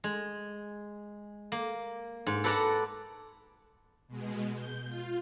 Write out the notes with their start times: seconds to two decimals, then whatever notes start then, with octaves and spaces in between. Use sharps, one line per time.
0.04 G#3
1.52 A#3
2.27 G#2
2.44 A4 B4 D5 F#5 A5 A#5
4.08 B2 G#3
4.55 G6
4.86 F4